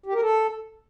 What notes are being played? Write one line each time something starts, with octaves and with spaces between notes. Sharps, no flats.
G4
A#4
A4